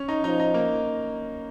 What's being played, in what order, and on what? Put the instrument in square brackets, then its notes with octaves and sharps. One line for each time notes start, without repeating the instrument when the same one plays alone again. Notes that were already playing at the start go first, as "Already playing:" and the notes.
Already playing: [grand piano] C#4
D#4
[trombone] F3 [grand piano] D#4
[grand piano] D#4
A#3